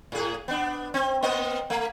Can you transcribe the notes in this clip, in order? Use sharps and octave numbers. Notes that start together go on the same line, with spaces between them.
A2 G#4
B3 D4
C4
A#3 C4 D#5
A3